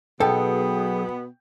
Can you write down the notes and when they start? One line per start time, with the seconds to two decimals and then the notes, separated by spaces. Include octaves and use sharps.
0.20 B1 B2 B3 G#4 A4 G5